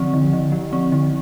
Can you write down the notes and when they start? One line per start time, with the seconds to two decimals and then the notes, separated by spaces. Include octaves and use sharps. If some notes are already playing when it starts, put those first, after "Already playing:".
Already playing: D3 F3 C4
0.14 D3
0.33 D3
0.52 F3
0.73 C4
0.92 D3